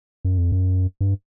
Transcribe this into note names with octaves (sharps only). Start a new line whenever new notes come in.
F#2
F2
F#2
G2